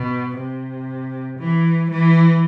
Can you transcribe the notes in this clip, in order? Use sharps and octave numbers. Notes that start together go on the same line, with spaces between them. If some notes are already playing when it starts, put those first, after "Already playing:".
Already playing: B2
C3
E3
E3